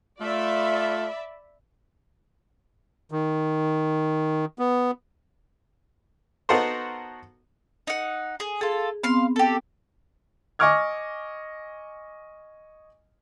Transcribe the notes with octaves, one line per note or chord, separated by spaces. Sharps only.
A3 F4 D5 E5 B5
D#3
B3
B3 D#4 F#4 A4 A#4 C5
D#4 F#5
G#4
F4 G#4 A4
B3 C4 F5 C6
G4 A4
D#5 G#5 C#6 D6 F6 G#6